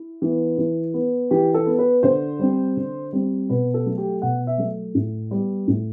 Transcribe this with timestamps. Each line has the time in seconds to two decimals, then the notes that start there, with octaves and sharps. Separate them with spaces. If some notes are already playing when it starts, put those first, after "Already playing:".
Already playing: E4
0.22 E3 B3
0.58 E3
0.94 B3
1.31 E3 G4
1.54 A4
1.66 B3
1.79 B4
2.03 D3 C5
2.39 G3 C4
2.77 D3
3.13 G3 C4
3.50 B2 B4
3.74 A4
3.86 F#3 A3
3.98 G4
4.22 B2 F#5
4.47 E5
4.58 F#3 A3
4.95 A2
5.31 G3 B3
5.68 A2